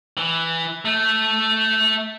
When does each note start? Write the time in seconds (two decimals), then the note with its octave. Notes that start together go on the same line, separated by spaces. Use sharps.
0.17 E3
0.85 A3